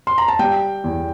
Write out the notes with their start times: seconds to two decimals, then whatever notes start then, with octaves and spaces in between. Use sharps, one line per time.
0.07 C6
0.18 A#5
0.28 A5
0.39 G3 G5
0.84 E2